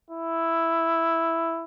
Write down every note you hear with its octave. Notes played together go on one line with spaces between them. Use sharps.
E4